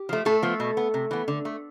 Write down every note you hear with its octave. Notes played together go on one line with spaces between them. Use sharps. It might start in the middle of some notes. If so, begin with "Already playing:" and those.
Already playing: G4
F3 A3
A2 A3 A4
F3 B3
B2
B3
C3
E3 B3
D3
A3